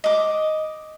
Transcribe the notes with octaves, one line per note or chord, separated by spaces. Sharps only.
D#5 D6